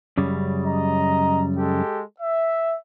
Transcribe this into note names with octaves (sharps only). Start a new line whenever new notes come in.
F#2 C#3 G3
D#5 A#5
G#3 G4 A4
E5